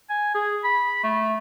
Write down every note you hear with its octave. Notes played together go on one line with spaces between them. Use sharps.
G#5
G#4
B5
A3